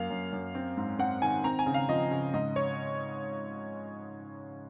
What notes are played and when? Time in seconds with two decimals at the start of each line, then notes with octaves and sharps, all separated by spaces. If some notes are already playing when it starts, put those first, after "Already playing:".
Already playing: F#2 A#3 F5
0.10 F#2
0.32 F#2
0.55 C4
0.77 G#2
0.99 C4 F#5
1.22 D#3 G#5
1.44 C4 A#5
1.59 G#5
1.66 C#3
1.74 F5
1.89 F3 D#5
2.11 C#3
2.34 G#2 D#5
2.56 C#5